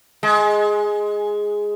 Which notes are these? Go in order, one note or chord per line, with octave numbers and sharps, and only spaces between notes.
G#3